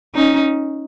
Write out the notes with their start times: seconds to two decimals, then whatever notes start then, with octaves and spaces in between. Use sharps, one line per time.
0.15 C#4 D#4